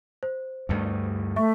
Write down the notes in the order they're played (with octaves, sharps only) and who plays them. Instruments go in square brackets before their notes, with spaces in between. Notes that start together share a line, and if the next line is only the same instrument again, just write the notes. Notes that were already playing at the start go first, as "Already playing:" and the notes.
[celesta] C5
[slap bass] D2 G2 A3
[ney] A3 [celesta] E5 C#6